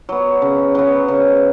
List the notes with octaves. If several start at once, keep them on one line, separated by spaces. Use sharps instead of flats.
F#3 B3
C#3
F#3 B3
C#3